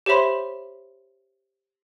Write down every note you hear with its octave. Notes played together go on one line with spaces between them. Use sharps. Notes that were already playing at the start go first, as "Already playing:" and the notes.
G4 C5 C#5 E5 B5 C6